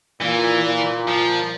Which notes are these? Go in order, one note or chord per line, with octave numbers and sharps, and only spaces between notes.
A#2 E3
A#2
F3